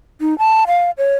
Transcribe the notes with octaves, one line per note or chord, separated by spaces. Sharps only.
D#4
A5
F5
C#5